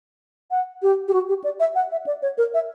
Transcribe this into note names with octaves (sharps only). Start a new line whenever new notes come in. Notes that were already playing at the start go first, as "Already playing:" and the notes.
F#5
G4
G4
F#4
G4
D5
E5
F#5
E5
D5
C#5
A#4
E5